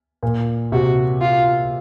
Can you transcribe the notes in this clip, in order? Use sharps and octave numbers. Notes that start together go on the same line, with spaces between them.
A#2
C3 F#4
F4